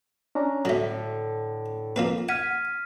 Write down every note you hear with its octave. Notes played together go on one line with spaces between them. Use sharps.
C#4 D4 A#5
A2 D3 F#3 A3 A4
F3 A#3 C4 B4
F#5 F6 G#6 B6 D#7